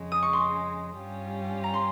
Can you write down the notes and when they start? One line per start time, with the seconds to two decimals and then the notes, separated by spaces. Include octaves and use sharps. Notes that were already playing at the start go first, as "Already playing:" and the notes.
Already playing: F2 C#3 G#3
0.12 D#6
0.23 C#6
0.33 C6
0.98 G2 G3 C#4 F4
1.64 A#5
1.74 C6